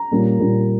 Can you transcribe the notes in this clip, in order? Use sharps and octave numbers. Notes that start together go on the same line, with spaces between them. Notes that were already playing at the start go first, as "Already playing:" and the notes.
Already playing: A#5
A#2 G3 A#3 C#4
A#2 G3 A#3 C#4